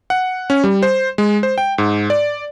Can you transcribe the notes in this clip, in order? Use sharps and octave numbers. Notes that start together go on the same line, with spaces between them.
F#5
C#4
G3
C5
G#3
C5
G5
G#2
D5